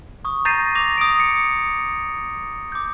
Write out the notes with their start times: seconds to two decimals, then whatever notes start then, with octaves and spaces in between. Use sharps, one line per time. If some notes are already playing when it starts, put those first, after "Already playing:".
0.25 C#6 D#6
0.45 A#5 G6 A6 A#6 C7 D#7
0.75 D6 A#6 F7
0.98 D#6 D7
1.20 C#7
2.72 D6 G6